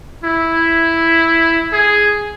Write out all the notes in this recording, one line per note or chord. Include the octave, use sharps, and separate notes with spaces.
E4
G#4